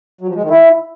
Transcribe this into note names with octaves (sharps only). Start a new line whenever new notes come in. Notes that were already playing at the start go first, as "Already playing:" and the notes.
F#3
F3
G#3
D#3
E4